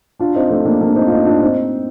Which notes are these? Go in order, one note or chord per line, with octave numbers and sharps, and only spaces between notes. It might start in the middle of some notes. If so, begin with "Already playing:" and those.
D4 F4
C4 D#4
A3 C4
A#3 D4
A#3 D4
C4 D#4
F4
C4 D#4
D4 F4
C4 D#4